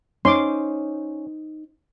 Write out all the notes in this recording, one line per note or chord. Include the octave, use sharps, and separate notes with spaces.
C#4 D#4 C5 C6 D6